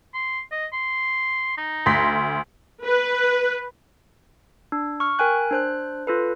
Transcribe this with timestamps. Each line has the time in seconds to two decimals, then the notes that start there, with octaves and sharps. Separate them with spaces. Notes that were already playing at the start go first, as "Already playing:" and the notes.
0.14 C6
0.52 D#5
0.73 C6
1.58 D#4
1.86 D2 C6 B6
2.83 B4
4.72 D4
5.00 C#6 F6
5.19 A#4 G5 G#5 F#6
5.51 D4 C5 F#6
6.07 F4 A4 B4